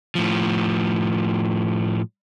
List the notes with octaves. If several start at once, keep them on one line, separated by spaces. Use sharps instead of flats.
A2 F3